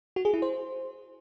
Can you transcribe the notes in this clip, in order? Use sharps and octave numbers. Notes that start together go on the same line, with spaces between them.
F#4
G#4
E4
C5